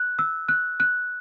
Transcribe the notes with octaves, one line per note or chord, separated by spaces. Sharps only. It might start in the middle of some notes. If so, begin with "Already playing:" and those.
Already playing: F#6
E6
F#6
F#6